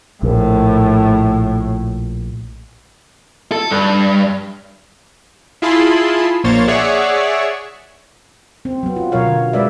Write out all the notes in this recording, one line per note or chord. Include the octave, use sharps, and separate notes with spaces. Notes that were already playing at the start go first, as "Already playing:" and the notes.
A#1 A2
A4
G2
E4 F4 G#4 A5 B5 C6
A#1 A#3 C5 C#5 A6
G#4 C#5 D5 E5 F#5 C#6
C4
F#3 B3
F4
B2 F#3 A#4 C#5 F5
D3
G#3 B4 D5 E5